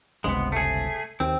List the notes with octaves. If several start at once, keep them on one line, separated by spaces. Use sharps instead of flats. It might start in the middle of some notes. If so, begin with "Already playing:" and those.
G1 C#2 C3 G#3 B3
A3 G#4
D#2 C4